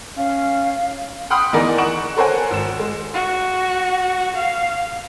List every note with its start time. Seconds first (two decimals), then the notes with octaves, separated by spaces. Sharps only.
0.17 C#4 F5
1.30 F#5 G5 B5 C6 D#6 F6
1.53 E3 B3 D#4 G#4 A#4 D5
1.78 F#5 C#6 D7 E7 F#7
2.16 A4 A#4 C5 C#5 F#5 G#5
2.51 G#1 E7
2.79 G#3
3.14 F#4
4.36 F5